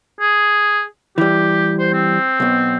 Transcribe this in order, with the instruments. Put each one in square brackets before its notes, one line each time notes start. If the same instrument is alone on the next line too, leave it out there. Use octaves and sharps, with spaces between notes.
[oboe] G#4
[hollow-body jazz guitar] E3 G3 [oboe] G4
[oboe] C5
C4
[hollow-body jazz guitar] B1 B2